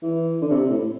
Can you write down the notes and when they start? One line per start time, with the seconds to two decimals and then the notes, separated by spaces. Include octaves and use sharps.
0.02 E3
0.42 D3
0.51 C3
0.70 A2